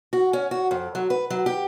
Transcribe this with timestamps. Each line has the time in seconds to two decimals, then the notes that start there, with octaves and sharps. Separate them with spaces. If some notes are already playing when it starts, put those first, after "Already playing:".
0.13 F#4
0.33 C#4
0.51 F#4
0.71 F2
0.95 F#3
1.10 B4
1.30 F#3
1.46 G4